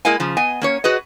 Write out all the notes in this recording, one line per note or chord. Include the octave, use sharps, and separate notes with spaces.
G#3 A#3 E4 D#5 F5 G#5
C#3 F3
B3 D#5 G#5
A#3 C#4 C#5
F#4 G#4 B4 D#5